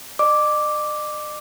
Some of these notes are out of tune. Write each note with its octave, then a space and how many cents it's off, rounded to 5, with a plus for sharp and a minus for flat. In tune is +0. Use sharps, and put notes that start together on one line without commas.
D#5 -45 D6 +0